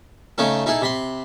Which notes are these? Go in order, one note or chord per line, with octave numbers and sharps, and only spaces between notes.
C#3 A3 C#4 D#4 A4
D#4 E4 G#4 A4
C3 B5 C6